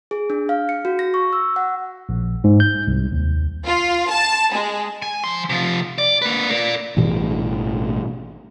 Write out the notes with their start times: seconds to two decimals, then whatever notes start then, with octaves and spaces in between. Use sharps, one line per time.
0.11 G#4
0.30 D4
0.49 F5
0.69 C#7
0.85 F#4
0.99 A#6
1.14 C#6
1.33 E6
1.56 F#5
2.09 A#1
2.44 G#2
2.60 G6
2.87 C2
3.12 D#2
3.65 F4
4.09 A5
4.52 G#3
5.02 G#5
5.24 F3 C6
5.49 C3 F3
5.98 D5
6.22 A#3 B4
6.50 A#4 D5
6.97 A1 G2 B2 E3